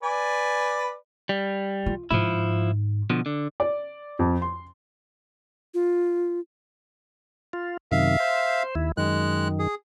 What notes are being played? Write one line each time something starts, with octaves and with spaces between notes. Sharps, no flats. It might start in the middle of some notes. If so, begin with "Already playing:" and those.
B4 D5 G#5
G3
F4
G#2 D#3 F3 E4
B2 D3 F3
D3
D5
F2
C6
F4
F4
F#2 C3 D#3 E5 F5
C5
D#2 E4
F#2 D#3 G#3 F#6
G#4